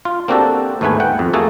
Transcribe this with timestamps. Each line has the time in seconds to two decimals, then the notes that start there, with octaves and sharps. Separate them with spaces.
0.05 F4
0.28 A#3 C4 D4 F#4 G4 A4
0.81 D#2 G#2 A3 B3 B4 G#5
1.00 F#5 G5
1.19 F2
1.33 A3 A#3 F#4 G#4 A4